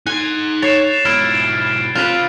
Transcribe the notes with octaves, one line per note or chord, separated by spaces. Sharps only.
D#4 G#5 C6 F#6
C#5 A6 C7 E7
G#2 B2 E4 F6 G#6 D7
C3 F4 B4